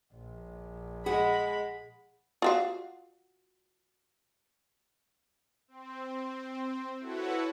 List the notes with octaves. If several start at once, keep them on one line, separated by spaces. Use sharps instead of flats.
A#1
G#3 G#4 F#5 B5
F4 F#4 F5
C4
E4 F#4 A4 B4 C#5 F#5